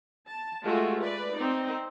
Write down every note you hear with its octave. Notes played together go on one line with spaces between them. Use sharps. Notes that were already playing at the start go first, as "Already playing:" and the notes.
A5
G#3 A3 F4 F#4
B4 D5
C4 D#4